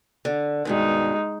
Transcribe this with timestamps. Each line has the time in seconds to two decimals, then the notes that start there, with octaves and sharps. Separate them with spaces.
0.25 D3
0.65 G2 B2 D#3 G#3 D#4